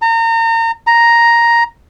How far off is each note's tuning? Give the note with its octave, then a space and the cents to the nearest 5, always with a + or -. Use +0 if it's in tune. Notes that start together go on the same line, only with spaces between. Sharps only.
A#5 -35
A#5 +5